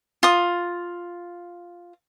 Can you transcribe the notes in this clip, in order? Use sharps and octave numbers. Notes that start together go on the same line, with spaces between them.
F4 D#6